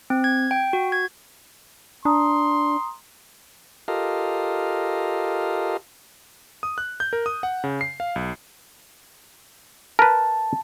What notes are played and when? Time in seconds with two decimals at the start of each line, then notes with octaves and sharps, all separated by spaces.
0.10 C4
0.24 G#6
0.51 G5
0.73 F#4
0.92 G#6
2.05 D4 A#5 C6 D#6
3.88 F4 G4 A4 A#4 D#5 F5
6.63 D#6
6.78 F#6
7.00 G6
7.13 A#4
7.26 D#6
7.43 F#5
7.64 C#3
7.81 C7
8.00 F5
8.16 B1
9.99 A#4 B4 A5